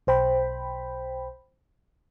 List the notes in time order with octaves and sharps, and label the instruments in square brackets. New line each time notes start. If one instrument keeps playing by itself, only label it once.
[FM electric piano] B1 C5 G5 B5